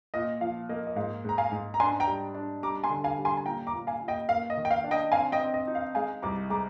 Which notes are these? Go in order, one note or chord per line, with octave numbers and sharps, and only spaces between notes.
A#2 D#5
F3 F5
A#3 D#5
D#5
G#2 F5
G#2 A#5
F5 G#5
G#2
A#5
D4 G#5 C6
G5 A#5
G3
D4
G3 A#5 D6
G#5 C6
D3
F5 G#5
G3
G#5 C6
G#5
A#2 G5 A#5
A#5 D6
A#2
F5 G#5
A#2
D#5 G5
A#3 F5
D#5
D#3
G5
F5
D4
D#5 G5
C4 F5 G#5
D#5 G5
C4
D#5
D#4
F5
G#3 F5 G#5
C2 A#5 D6
G#3 A#5 D6